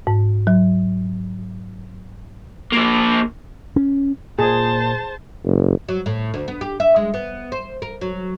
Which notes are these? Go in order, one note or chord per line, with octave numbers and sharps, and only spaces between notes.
G#2
F#3
F3 A#3
C#4
A#2 G#4 C5 A5
F#1
F#3
A2
D2
B3
G4
E5
G#3
B3
C5
A#4
F#3